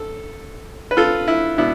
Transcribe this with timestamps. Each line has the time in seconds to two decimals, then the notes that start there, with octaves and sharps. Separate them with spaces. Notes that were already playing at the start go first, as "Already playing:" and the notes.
Already playing: A4
0.91 B4
0.97 F4 A4
1.28 E4
1.58 B2 B3 D4 E4